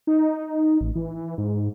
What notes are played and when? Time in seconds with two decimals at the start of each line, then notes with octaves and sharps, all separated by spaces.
0.07 D#4
0.81 A1
0.95 E3
1.38 G#2